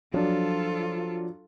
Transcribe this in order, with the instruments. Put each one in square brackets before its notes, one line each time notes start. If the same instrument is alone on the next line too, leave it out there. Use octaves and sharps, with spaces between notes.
[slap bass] F3 [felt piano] F#3 D4 [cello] F4 A4